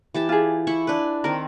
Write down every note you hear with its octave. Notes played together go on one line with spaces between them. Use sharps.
E3 G4 A5
F4 G#4
E4 E5 C#6
D4 B4
D#3 C4 A#4